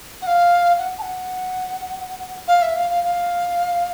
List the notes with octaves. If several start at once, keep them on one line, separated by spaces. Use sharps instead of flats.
F#5
F5
F#5
A5
F#5
F5
E5
F5
F5
F5